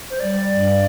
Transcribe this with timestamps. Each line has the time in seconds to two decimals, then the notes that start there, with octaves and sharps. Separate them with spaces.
0.10 C5
0.20 G3 D5
0.49 G2